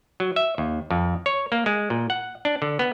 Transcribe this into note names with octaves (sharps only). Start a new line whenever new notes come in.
F#3
E5
D#2
F2
C#5
A#3
G#3
A#2
F#5
D4
D3
B3